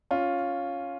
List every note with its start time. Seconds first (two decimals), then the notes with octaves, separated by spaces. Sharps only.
0.11 C#4 F4